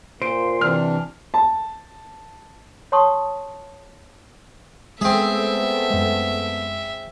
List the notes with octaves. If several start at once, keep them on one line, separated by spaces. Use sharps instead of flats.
A#2 C5 D7
C3 E3 D4 F6
A5
C#5 F#5 A5 C6 C#6 D#6
G#3 A3 B3 C4 G#4 A4 E5
F#2 G#3